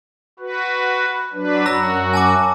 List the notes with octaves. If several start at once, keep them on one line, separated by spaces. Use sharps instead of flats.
F#4 B4
F#3 D4 B4
F#2 F#4 A#5 E6 A#6
G#5 A5 D6